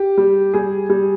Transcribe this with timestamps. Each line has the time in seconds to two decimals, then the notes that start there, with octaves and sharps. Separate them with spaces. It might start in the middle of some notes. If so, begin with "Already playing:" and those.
Already playing: G4
0.17 G3
0.54 G3 G#4
0.90 G3